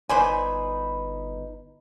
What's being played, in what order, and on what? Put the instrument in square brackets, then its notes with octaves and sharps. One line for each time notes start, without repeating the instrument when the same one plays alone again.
[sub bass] G1 [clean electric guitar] D#4 B4 [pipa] C5 D5 G#5